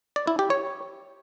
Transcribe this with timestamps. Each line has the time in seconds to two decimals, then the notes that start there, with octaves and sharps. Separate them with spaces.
0.16 D5
0.27 E4
0.39 G4
0.50 C#5